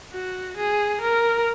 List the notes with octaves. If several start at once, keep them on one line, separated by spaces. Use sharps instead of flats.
F#4
G#4
A#4